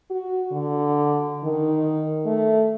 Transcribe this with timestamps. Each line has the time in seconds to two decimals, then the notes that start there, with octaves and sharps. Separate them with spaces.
0.11 F#4
0.52 D3
1.44 D#3
2.26 A3